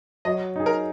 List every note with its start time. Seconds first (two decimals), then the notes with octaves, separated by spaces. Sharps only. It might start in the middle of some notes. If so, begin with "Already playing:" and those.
0.25 F#3 D#5
0.56 D#4 G#4
0.66 A#4